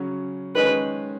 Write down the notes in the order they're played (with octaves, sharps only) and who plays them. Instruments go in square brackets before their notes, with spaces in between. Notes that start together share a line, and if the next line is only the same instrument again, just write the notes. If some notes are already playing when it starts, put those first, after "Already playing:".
Already playing: [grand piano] C#3 F#3 C#4
[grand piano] D#3 G#3 C#4 G#4 [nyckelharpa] B4